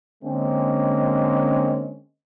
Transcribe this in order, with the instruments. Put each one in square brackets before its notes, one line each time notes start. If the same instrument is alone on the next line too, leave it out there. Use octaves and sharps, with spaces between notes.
[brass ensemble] D3 G#3 A#3 C4 C#4